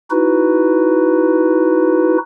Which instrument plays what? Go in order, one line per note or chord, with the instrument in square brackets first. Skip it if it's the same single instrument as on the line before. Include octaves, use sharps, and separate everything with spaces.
[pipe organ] D#4 E4 F#4 B4